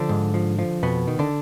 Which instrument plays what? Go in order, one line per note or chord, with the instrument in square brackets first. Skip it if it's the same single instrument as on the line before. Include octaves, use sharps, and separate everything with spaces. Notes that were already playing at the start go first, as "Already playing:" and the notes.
Already playing: [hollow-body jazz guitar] D3 F3 D4
G#2
F3
F3
F2 B2 B3
D#3
D3 D4